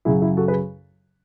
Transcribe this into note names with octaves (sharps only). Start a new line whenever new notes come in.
F#2 C#3 F#3 E4 G#4
E4 G#4
F#4 A4
G#4 B4